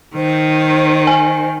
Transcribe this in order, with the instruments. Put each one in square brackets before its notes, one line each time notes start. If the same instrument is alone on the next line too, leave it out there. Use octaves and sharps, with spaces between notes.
[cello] D#3 [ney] C5
[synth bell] G#5